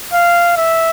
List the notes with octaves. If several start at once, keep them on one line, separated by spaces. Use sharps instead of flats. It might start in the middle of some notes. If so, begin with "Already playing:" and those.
F5
E5